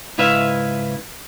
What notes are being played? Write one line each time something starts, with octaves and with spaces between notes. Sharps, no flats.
C#2 G#2 E4 B4 E5 F5